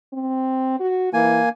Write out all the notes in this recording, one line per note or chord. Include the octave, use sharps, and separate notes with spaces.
C4
F#4
E3 A#3 G#5